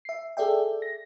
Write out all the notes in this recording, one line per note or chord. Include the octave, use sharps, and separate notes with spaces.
E5 C7
G#4 A4 D5 E5 G5
A#6